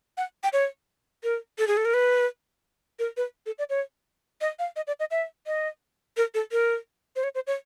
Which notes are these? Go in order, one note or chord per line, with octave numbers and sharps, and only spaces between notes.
F#5
G5
C#5
A#4
A4
G#4
A4
A#4
B4
A#4
B4
A4
D5
C#5
D#5
F5
D#5
D5
D#5
E5
D#5
A#4
A4
A#4
C5
C#5
C5
C#5